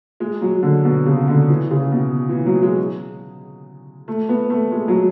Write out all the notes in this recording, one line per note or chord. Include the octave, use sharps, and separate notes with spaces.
G#3
F#3
D3
B2
C#3
D3
E3
C#3
B2
E3
F#3
G#3
A3
B3
A3
G#3
F#3